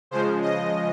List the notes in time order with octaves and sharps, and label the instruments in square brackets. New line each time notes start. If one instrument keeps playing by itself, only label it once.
[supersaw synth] C#3 F3 G#3 C5
D#5